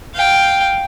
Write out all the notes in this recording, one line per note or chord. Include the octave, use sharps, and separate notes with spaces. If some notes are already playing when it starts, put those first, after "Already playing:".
F5 G5